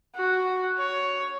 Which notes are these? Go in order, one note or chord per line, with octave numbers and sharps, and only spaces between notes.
F#4
C#5